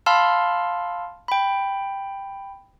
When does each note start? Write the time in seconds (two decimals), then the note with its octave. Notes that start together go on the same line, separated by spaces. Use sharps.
0.06 F5 A5 B5 C6 E6 F6
1.28 G5 B5